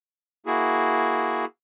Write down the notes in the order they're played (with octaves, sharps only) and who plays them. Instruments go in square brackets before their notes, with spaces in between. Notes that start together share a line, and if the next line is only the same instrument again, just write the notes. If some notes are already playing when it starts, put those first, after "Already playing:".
[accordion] A#3 E4 F#4 G#4